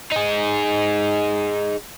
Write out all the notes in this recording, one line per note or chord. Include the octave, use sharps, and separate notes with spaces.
D#4 G#4